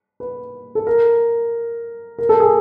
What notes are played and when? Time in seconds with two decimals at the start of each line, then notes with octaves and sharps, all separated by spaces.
0.20 B4
0.75 A4
0.87 A#4
2.19 A#4
2.29 A4
2.40 G#4